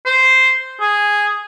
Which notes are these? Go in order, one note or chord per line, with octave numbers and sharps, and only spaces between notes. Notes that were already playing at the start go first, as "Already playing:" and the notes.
C5
G#4